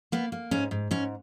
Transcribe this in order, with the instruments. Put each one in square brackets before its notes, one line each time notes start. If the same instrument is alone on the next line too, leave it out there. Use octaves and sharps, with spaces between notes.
[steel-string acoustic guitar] A#3 B3
A#3
G#2 C#4
G#2
G#2 C#4